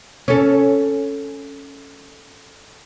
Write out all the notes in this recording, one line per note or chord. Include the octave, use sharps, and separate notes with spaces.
C#4 A4